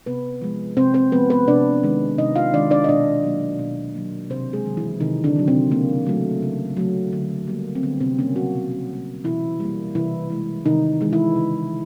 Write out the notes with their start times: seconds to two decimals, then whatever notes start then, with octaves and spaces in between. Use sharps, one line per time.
0.06 C3 B3 B4
0.41 F3 G#3
0.77 C3 C4 C5
0.94 C4 C5
1.12 F3 G#3 B3 B4
1.30 B3 B4
1.47 C3 D4 D5
1.83 D#3 G#3
2.18 C3 D#4 D#5
2.36 F4 F5
2.53 D#3 G#3 D4 D5
2.71 D4 D5
2.84 D#5
2.89 B2 D4 D5
3.24 F#3 A#3
3.59 B2
3.95 F#3 A#3
4.30 C3 C4 C5
4.53 G#3 G#4
4.66 D#3 F#3
4.77 E3 E4
5.00 C3 D#3 D#4
5.24 D3 D4
5.36 D#3 F#3
5.48 C3 C4
5.71 C#3 A#3
6.07 F#3 A3
6.42 C#3
6.77 F#3 A3
7.13 D3
7.47 G3 A#3
7.75 C4
7.83 D3 B3
8.00 C3 C4
8.18 C#3 G3 A#3 C#4
8.36 F#3 F#4
8.54 B2
8.89 G3 A#3
9.24 B2 E3 E4
9.60 G3 A#3
9.95 C3 E3 E4
10.30 E3 G#3
10.66 C3 D#3 D#4
11.01 E3 G#3
11.13 E3 E4
11.36 C#3